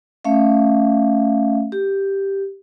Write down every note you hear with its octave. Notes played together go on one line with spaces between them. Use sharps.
A3 C#4 E5 F5
G4